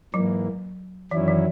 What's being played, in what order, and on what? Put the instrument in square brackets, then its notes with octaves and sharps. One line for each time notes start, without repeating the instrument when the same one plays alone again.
[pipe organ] G#2 E3 A#3 [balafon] F#3
[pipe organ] F#2 D#3 F#3 C#4 E4 [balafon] E3
[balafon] E3